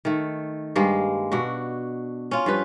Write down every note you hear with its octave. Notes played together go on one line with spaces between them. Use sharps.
D#3 A3
G2 G#3 A#3
B2 D4 F#4
C#4 F4
G2 F3 B4